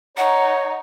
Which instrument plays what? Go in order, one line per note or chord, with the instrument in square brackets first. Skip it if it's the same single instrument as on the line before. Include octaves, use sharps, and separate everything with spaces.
[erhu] D#4 [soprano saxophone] C#5 [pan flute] F#5